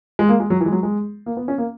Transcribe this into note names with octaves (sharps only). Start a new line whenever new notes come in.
G#3
A#3
G#3
F#3
E3
G#3
F#3
G#3
A#3
B3
C#4
A#3